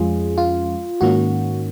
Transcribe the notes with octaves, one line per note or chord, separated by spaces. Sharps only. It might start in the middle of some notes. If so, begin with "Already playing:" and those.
Already playing: F2 F3 G#3 C#4 F4 G#4
F4
G#2 D#3 A#3 C#4 F#4